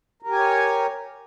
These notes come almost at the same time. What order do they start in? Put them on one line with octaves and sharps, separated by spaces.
A#4 G4 G#5 C#5